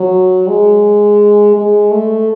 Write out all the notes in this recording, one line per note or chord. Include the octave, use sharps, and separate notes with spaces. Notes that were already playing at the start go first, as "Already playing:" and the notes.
Already playing: F#3
G#3
G#3
A3